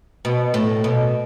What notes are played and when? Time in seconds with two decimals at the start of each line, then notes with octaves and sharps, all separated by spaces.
0.25 B2
0.54 A2
0.84 B2